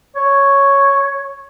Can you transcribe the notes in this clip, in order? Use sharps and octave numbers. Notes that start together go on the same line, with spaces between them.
C#5